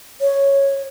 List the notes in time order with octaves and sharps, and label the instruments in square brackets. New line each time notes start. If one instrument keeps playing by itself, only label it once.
[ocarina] C#5